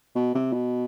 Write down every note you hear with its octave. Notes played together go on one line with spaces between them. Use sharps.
B2
C3
B2